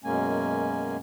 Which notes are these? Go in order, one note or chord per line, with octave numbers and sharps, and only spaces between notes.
F#2 B2 G#3 A#3 C#4 G#5